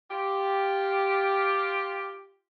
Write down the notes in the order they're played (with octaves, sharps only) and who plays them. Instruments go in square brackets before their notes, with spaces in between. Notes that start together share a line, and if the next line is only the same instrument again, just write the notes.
[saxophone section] F4 G4